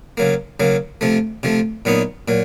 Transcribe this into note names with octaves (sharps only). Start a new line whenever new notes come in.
C#3 F#3 A#3
C#3 F#3 A#3
C3 F3 A3
C3 F3 A3
A#2 F#3 B3 D#4
A#2 F#3